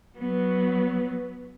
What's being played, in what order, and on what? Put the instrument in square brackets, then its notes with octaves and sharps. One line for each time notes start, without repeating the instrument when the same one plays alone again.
[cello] F#3 B3